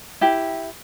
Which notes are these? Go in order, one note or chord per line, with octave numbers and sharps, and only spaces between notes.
E4 G4